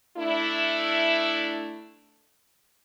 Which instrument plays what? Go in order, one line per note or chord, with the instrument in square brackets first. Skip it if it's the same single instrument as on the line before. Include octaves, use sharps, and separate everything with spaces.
[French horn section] A3 D4 E4